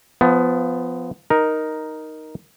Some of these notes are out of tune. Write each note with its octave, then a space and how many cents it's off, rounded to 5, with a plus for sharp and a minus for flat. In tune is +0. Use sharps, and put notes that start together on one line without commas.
F3 +0 B3 +20
D#4 +0 A#4 +5